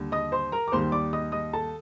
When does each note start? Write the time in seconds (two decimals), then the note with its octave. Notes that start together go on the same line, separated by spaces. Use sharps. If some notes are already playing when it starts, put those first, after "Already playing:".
Already playing: D#2 D3 G3
0.12 D#5 D#6
0.32 C5 C6
0.52 A#4 A#5
0.68 D6
0.72 D#2 D#3 G3 C5 C6
0.92 D5 D6
1.13 D#5 D#6
1.32 D#5 D#6
1.53 A4 A5